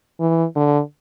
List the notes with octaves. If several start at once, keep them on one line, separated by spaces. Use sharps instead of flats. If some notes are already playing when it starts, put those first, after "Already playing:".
E3
D3